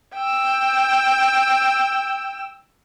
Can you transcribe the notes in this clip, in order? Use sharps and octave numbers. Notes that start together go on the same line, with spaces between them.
G5 E6